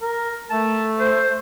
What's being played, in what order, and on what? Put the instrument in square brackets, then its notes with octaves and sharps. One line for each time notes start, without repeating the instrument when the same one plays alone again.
[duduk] A#4
[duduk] A3 [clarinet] A5
[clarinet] C5